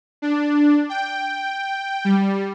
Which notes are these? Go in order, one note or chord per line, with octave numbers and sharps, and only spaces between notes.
D4
G5
G3